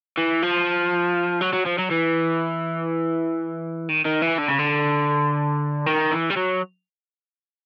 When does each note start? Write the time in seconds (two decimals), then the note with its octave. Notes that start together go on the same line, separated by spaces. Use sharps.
0.18 E3
0.43 F3
1.42 F#3
1.54 F#3
1.66 F3
1.79 F#3
1.91 E3
3.89 D#3
4.05 D#3
4.22 E3
4.38 D3
4.48 C#3
4.59 D3
5.87 D#3
6.12 E3
6.30 G3
6.37 F#3